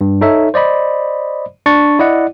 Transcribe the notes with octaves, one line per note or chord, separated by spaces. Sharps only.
G2
D#4 A4 C#5 E5
C5 D5 D#5 B5
D4 C#6 A6
E4 D5 D#5 F#5